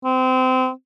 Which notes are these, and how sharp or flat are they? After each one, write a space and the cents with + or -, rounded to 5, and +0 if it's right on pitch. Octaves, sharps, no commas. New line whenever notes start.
C4 -25